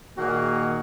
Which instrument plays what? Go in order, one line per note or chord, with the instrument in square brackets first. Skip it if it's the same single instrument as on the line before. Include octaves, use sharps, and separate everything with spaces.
[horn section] A#2 D#3 A#3 F#4 G#4 F#5